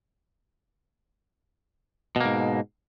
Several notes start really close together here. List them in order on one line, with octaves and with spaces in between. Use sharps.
B2 A#3 G#2